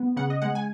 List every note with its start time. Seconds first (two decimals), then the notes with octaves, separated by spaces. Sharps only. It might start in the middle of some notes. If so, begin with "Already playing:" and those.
Already playing: B3
0.16 C#3 F#5
0.30 D#5
0.42 G#3 F#5
0.55 G#5